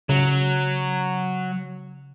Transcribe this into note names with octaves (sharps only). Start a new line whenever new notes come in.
C#3 F#3